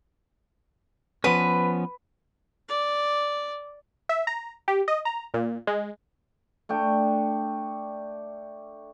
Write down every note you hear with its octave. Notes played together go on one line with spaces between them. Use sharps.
F3 B3 C#4 B4
D5
E5
A#5
G4
D#5
A#5
A#2
G#3
A3 D4 G5